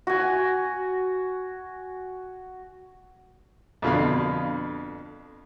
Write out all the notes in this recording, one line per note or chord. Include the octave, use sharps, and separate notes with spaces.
F#4 G#5
F2 B2 D3 F5 B5